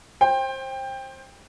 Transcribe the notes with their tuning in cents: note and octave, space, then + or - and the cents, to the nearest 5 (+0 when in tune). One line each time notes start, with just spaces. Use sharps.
C5 +25 G5 +15